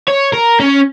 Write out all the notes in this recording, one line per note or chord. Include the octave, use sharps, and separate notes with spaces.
C#5
A#4
C#4